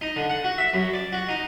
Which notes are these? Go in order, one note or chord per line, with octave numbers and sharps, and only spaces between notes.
D#4
D3
F#5
F#4
E5
F#2
D5
F#4
D#4